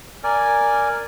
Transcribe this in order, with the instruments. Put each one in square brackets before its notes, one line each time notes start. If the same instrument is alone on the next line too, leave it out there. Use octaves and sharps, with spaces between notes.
[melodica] A#4 D5 G#5